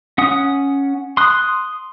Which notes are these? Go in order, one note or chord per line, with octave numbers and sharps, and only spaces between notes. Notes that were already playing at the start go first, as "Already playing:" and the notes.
C#4 F#5 D#6
C6 D#6 F#6